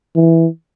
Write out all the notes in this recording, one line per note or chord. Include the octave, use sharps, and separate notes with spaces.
E3